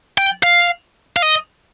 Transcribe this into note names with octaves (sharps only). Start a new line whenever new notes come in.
G5
F5
F5
D#5